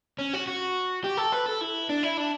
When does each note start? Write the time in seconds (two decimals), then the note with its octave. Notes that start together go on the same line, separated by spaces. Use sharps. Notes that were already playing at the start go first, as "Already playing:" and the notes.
0.19 C#4
0.33 F#4
0.48 F#4
1.04 G4
1.17 A4
1.32 B4
1.46 A4
1.61 E4
1.89 D4
2.03 E4
2.17 D4